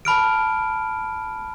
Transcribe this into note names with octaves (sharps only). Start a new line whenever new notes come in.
A5 B5 F6 D7